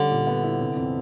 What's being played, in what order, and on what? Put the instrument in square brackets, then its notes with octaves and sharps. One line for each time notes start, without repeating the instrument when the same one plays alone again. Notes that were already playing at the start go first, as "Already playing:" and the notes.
Already playing: [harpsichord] D3 [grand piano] G3 C#4
[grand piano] A#2
B3
E4
C3
F2